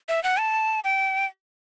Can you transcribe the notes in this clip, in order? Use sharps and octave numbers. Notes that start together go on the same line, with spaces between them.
E5
F#5
A5
G5